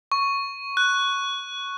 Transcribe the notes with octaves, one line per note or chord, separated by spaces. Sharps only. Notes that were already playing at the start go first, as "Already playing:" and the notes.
C#6
F#6